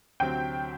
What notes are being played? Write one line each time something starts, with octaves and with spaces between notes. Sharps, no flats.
D2 C3 F#3 C4 F#4 G5